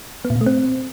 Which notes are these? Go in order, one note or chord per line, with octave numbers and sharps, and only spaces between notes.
B3
A#2
B2
A3
C4